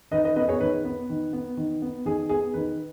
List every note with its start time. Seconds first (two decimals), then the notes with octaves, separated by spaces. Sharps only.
0.11 D#3 B4 D#5
0.24 B4 D#5
0.36 B3 B4 D#5
0.48 G#4 C#5
0.60 D#3 B4
0.85 B3 B4
1.10 D#3
1.33 B3
1.57 D#3
1.82 B3
2.05 D#3 G#4
2.29 B3 G#4
2.54 D#3 B4